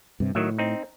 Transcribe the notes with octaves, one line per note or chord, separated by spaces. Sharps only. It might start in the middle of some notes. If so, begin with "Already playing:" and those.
G2 C3
A2 D#3 F#3 E5
C4 D#4